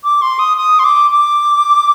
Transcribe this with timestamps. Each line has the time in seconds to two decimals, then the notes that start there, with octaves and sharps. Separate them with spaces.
0.04 D6
0.22 C6
0.39 D#6
0.57 D#6
0.79 C6
0.84 D6
1.11 D6